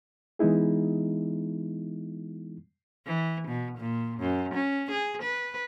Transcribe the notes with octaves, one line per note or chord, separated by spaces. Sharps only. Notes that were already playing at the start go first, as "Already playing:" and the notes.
E3 G#3 B3 D#4 E4 G#4
E3
B2
A#2
F#2
C#4
G#4
B4